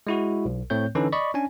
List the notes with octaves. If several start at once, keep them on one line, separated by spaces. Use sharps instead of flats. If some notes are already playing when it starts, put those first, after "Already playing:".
G#3 E4 F#4
B1
A2 A3 C4 C#5 G6
D3 E3 C#4 D#4 A4 B4
D5 D#5 B5 C#6
C#4 D4 G#5